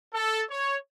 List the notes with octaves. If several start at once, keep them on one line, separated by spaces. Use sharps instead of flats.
A4
C#5